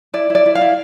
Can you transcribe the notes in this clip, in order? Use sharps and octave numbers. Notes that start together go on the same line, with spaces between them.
E4 D5
E4 D5
E4
F5
E4